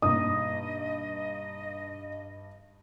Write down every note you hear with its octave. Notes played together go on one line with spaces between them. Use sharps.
G2 B2 A#3 D#4 D#5 D#6